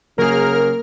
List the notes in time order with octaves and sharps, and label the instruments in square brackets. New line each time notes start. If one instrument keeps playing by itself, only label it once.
[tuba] C#3 [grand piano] F#3 G#4 [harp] A#3 [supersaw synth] A#4 F6